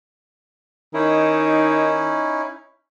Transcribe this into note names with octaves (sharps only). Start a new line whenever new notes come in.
D#3 C#4 D#4 E4